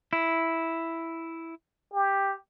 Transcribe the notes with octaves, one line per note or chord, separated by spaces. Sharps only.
E4
G4